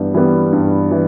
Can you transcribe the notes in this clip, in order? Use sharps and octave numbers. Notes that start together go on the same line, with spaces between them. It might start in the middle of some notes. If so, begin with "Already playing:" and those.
Already playing: G2 E3 G3 B3
E3 G3 B3
G2
E3